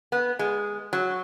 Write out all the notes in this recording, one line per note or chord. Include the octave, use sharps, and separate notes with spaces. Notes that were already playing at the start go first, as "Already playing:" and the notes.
B3
G#3
F#3